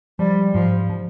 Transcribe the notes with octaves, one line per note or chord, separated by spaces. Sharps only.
F3 G3
G#2 F3
F3